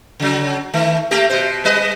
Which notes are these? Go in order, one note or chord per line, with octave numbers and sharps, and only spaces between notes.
C#3 F#3
D#3 A3
A3 A#3 G4
B2 C5
G3 B4 D#5